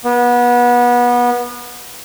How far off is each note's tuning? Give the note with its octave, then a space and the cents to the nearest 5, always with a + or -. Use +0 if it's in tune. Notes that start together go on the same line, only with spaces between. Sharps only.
B3 -25